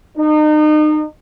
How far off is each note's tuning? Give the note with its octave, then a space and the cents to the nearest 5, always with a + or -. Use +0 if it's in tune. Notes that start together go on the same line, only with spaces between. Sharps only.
D#4 -35